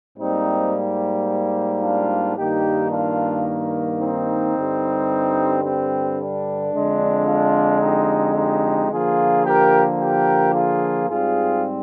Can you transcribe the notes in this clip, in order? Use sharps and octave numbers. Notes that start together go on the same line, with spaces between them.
G#2 G3 A#3 C4 D#4
D4 F4
G2 D#3 A#3 D#4 G4
D4 F4
C4 D#4
G2 D3 G3
C4
D4
F2 D3 G#3
D4 F4
D#4 G4
D#4 G4
D3 F3 A#3 F4 G#4
G4 A#4
G4 A#4
F4 G#4
G#2 G3 C4 F4 G#4